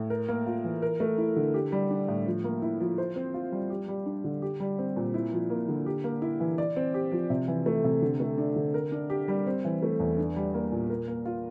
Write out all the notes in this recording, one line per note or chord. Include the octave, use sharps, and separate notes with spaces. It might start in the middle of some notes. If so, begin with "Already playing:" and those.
Already playing: A2
A#4
A#3
F4
E3
A#4
A3
E4
D3
G4
G3
D4
A2
F3
A#3
E4
F3
C5
C4
F4
G3
G4
G3
D4
D3
G4
G3
C4
A#2
E4
F3
A#3
D3
G4
A#3
E4
E3
D5
C4
G4
F3
C3
E3
A3
C3
D3
A3
D4
D3
A#4
D4
G4
G3
C4
E3
A3
E2
D4
G3
A#3
A#2
A#4
A#3
F4